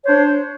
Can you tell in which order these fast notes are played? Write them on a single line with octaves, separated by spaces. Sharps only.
C#5 C5 D4